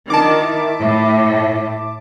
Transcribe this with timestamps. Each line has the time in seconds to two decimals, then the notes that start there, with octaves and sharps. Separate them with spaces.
0.10 D#3 D4 F4 A5 D6
0.45 E4 E5
0.78 A2